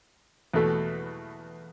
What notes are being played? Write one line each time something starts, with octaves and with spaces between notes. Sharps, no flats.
E2 B2 A3